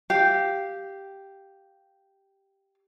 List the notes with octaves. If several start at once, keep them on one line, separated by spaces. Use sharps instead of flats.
G4 F5